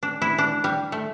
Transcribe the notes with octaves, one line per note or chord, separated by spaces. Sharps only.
D4
E4
D4
G3
A3